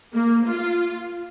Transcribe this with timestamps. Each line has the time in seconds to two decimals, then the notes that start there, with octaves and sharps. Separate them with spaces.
0.14 A#3
0.47 F4